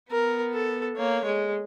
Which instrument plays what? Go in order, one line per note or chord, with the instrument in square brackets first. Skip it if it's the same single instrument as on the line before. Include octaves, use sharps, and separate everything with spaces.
[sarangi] B3 [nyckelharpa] A#4
[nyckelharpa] A4
[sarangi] A#3 [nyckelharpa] C#5
[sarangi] G#3